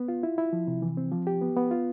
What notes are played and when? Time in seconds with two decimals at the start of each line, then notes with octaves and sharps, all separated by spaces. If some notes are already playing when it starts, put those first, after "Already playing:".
Already playing: B3
0.08 F4
0.23 E4
0.38 E4
0.53 F3
0.67 C3
0.82 E3
0.97 C4
1.12 F3
1.27 G4
1.41 B3
1.57 B3
1.71 F4